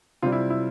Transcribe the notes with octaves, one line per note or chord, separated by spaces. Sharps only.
C3 G3 F4
E4
E4